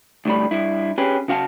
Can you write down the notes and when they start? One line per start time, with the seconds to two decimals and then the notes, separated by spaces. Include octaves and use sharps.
0.25 D2 A2 G3 B5
0.51 G2 E4
0.98 C#4 G4 G#4 B4
1.28 C#3 F#4 F5 F#5 A5